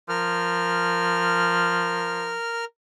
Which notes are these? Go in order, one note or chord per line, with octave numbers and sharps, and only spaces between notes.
F3 A#4 F6